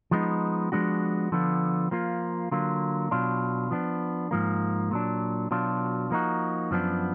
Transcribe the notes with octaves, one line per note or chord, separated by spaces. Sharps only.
F3 G#3 B3 D#4
F3 G#3 B3 D4 F#4
D3 F3 B3 F4
F3 A#3 F4
D3 F#3 A#3 F4
B2 F#3 D4 F4
F3 B3 D4
G#2 F3 A#3
A#2 F#3 D4
B2 F#3 D4 F4
F3 A#3 D#4 F#4
F#2 F3 B3 D4